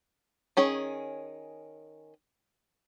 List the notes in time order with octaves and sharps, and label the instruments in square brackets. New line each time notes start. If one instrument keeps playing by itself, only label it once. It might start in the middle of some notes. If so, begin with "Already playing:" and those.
[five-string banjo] D#3 C#4 G#4 C#5